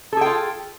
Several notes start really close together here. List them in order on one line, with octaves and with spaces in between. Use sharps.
A4 G#4 G5 F4